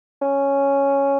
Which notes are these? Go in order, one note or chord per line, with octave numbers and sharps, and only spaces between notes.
C#4